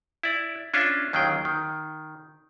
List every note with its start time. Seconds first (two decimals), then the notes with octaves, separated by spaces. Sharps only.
0.23 E4 D5
0.74 C#4 D4 F4 E5
1.13 D#2 D#3 F#3 G#4 G5
1.45 D#3